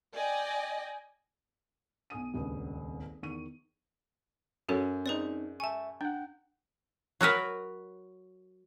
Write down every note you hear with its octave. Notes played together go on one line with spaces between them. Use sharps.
D5 D#5 G5 G#5
B1 G#5 D#6 D#7
D#1 G#1 C#2 G2
E2 D#3 C#6 D#7
F#2 F#4 A4 C#5
C4 D#4 G#4 B4 D5
E5 G#5 A5 C#6
D4 F#5 G5
F#3 F#4 A#4 B4